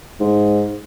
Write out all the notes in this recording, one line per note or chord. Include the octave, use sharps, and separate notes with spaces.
G#2